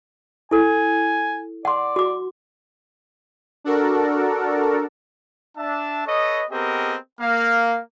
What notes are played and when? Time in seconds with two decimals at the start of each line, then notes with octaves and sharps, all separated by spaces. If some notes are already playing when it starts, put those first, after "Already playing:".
0.51 E4 A4 G#5
1.65 D5 F#5 C6
1.96 F#4 D6
3.64 D4 F#4 A4 A#4
5.58 D4 E5 A5
6.07 A4 B4 C#5 D#5
6.51 B3 C4 G4 G#4 A#4 D#5
7.21 A#3 F5